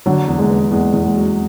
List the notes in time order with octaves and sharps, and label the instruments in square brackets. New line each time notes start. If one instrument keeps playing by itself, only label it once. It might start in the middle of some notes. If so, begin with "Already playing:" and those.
[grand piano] D3 [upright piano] F#3
[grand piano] E2
[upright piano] G#3
[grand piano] B3
[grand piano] E2 [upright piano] G#3
[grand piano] E2
[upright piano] G#3
[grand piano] F#3